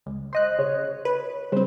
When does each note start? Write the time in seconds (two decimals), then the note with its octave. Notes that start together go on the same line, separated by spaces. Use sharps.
0.06 C#2
0.33 C5 D#5 F#6
0.59 C#3 C#5
1.05 B4
1.52 C#3 G3 C4 C5